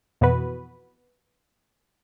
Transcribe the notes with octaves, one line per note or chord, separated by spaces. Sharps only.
F2 B2 E3 B3 F#4 B4